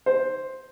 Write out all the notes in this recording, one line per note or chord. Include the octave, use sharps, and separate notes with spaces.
C5